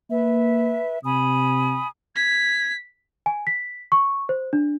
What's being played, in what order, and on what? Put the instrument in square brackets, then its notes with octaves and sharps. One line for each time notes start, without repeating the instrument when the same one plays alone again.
[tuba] A#3 [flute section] B4 E5
[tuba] C3 [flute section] G#5 B5 D#6
[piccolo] G#6 [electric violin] B6
[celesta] G#5
B6
C#6
C5
D4